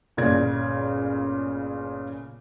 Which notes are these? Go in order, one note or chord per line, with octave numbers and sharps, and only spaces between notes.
G1 A#2 C#3 D5 G#6